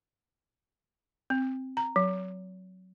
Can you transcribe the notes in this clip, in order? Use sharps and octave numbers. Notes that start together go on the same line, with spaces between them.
C4
A#5
F#3